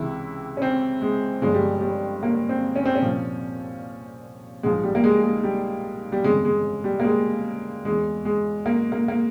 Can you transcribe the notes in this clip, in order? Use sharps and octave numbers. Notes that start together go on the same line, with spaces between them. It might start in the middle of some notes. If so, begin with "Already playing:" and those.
Already playing: C#2 C3 E3 E4
C#4
C4
G#3
G1 G2 F3 G#3
G3
G3
A#3
C4
C#4
C4
C#4
C2 A#2 F3
A#1 G#2 F3 G#3
G3
A#3
G#3
G#3
G3
G3
G1 F2 C#3 E3 G#3
G#3
G3
A#3
G#3
E2 E3 G#3
G#3
A#3
A#3
A#3